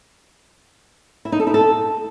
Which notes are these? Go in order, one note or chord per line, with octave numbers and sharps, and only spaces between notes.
E4
D#4
A4
E4
A4